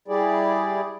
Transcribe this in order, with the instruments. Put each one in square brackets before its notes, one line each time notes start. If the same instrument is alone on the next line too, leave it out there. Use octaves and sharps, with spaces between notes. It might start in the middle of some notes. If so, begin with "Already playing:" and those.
[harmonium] G3 E4 G4 G#4 D5